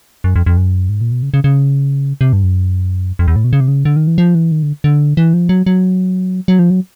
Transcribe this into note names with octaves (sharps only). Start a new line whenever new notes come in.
F#2
F2
F2
F#2
G#2
A#2
B2
C#3
C#3
C#3
C3
G2
F#2
F2
E2
A2
B2
C#3
C3
C#3
D3
D#3
E3
F3
E3
D#3
D3
D3
E3
F3
F#3
F#3
F#3
F3
F#3